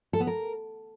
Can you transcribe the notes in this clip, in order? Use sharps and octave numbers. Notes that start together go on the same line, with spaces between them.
A4
B3
A#4